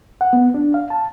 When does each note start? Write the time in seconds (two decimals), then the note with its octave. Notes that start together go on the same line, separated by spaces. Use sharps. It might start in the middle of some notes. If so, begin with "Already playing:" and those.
0.21 F#5
0.33 B3
0.54 D4
0.74 F5
0.90 A5